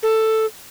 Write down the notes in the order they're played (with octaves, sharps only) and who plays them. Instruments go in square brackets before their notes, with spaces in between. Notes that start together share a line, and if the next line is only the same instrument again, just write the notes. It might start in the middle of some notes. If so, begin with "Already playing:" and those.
[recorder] A4